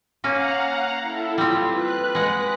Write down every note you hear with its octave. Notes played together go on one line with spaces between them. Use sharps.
A#3 C#4 F5 F#5 A#5
E4 A4
G3 C4 F4
B4 F#6
G#3 F#5